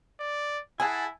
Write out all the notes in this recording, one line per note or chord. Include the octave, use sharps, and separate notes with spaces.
D5
E4 G#4 F#5 G#5 A5